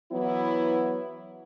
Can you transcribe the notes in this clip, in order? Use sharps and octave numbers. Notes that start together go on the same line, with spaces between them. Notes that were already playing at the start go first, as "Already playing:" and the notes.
E3 F#3 B3 E4